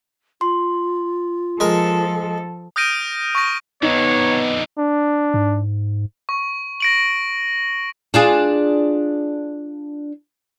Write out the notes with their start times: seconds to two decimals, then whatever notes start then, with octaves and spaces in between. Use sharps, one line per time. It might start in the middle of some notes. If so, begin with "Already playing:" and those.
0.41 F4 C6
1.60 F3 G#3 A4 A#4
2.76 D#6 F6 G6 A#6 D7 D#7
3.35 C#6 A#6
3.83 F2 D3 B3 D#4 C#5
4.78 D4
5.34 G#2
6.29 C#6
6.80 A#6 D7 F#7
8.14 D4 F4 G#4